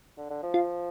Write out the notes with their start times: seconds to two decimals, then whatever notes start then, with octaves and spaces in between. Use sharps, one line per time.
0.17 D3
0.30 D3
0.43 F3
0.54 F4